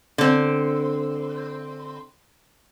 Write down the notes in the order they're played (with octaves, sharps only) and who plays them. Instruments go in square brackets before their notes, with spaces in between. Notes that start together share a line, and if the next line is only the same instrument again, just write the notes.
[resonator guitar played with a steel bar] D3 C4